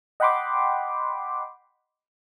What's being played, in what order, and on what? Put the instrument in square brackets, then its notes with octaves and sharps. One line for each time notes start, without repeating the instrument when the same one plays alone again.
[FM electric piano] D#5 F#5 G5 B5 C6 D6